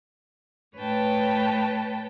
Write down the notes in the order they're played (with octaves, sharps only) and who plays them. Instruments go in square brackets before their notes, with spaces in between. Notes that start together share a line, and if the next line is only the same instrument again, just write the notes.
[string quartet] A2 B4 C#5 G5 A5